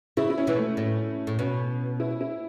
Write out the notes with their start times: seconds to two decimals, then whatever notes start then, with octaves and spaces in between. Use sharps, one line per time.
0.17 C#3 E4
0.30 E4
0.38 C#4
0.47 B2 E3
0.57 A3
0.77 A2 C#4
1.27 A2
1.38 B2 C#4
2.00 E4
2.21 E4